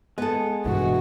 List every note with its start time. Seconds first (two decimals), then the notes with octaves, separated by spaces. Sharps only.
0.18 G#3 B3 G#4 A4
0.66 G2 B2 E3 F#4